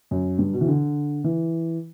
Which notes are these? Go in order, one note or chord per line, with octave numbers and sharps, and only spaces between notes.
F#2
G2
B2
E3
D3
E3